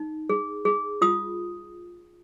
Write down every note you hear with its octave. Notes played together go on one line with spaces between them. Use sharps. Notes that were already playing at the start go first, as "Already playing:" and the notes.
Already playing: D#4
G#4
G#4
F4 D#6